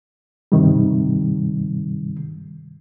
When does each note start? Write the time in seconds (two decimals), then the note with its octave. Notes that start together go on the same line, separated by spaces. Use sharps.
0.52 G2 C3 D#3 G3